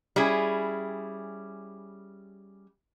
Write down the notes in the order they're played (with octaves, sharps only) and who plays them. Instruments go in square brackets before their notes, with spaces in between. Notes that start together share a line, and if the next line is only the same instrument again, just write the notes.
[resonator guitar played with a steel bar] G3 C#4 E4 G#4